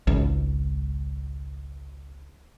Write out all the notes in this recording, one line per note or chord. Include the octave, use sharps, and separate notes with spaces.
G#1 C#2